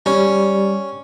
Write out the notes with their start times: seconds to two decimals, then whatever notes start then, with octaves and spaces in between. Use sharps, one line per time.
0.06 G3 C#4